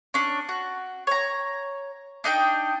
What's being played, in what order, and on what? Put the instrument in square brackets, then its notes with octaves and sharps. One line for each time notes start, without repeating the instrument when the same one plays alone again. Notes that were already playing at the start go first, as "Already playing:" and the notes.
[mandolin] C#4 D4
F#4
C#5 A#5
D4 D#4 D#5 G5